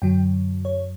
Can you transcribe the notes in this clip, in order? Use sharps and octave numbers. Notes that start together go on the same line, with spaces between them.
F#2 D3 F#3 G5
C#5